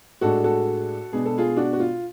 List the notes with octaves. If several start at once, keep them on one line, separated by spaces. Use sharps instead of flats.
A2 G#3 D4 F#4 A4
F#4 A4
B2 G#3 B3 D4 G#4
A4
F4 G#4
D4 F#4
F#4
F4